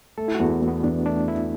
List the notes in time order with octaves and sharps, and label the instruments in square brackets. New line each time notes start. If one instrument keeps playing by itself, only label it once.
[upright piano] A3 [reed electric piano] A4
[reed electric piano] E4
F#4
[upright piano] E2
[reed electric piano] A3
[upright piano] E2
[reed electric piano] B3
[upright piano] E2 [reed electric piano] D4
[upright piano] A3 [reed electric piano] D4
[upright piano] E3 [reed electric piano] E4